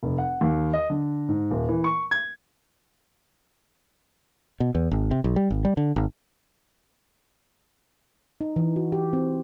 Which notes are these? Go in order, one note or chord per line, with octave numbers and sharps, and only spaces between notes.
F1
F#5
D#2
D#5
D3
G#2
D#1
E3
C#6
G#6
B2
E2
G#1
C3
B1
G3
G#1
G3
D3
G#1
D#4
E3
F#4
G4
C4